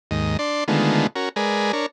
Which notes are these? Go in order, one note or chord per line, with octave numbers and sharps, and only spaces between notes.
D#2 G#2 D#5
D4 D5 C6
D3 D#3 G#3 A3 B3 F4
C#4 F#4 A#4
G#3 G#4 A#4 B4 D5
D4 A#4 C#5